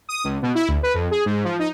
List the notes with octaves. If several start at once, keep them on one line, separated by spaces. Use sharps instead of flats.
D#6
C#2
B2
E4
D2
B4
F2
G#4
G#2
F3
D#4